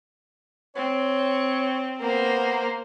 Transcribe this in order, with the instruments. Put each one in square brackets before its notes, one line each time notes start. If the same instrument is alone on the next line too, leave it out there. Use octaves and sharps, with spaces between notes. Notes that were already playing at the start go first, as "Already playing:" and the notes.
[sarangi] C4 [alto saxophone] C#5
[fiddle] A#3 C5 [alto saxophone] B3